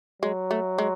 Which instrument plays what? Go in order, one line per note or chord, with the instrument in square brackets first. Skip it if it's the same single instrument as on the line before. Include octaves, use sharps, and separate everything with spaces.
[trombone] F#3 [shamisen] G#3
[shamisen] A3
G#3